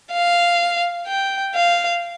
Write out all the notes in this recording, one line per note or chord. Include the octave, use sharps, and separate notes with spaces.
F5
G5
F5